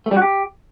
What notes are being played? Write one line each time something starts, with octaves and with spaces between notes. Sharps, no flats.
A3
G3
F#4
G4